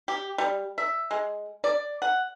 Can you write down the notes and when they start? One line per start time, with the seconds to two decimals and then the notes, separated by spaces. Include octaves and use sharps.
0.08 G4
0.38 G3
0.78 E5
1.11 G#3
1.64 D5
2.02 F#5